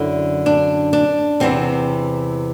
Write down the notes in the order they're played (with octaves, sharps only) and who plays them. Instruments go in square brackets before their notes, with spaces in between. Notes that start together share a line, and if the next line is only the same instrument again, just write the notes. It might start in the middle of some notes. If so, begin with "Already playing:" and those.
Already playing: [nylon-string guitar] F#2 D3 E4
D4
D4
E2 C3 E3 C4